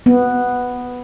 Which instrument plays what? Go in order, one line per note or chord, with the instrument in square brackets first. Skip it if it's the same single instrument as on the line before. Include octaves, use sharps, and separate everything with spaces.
[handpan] B3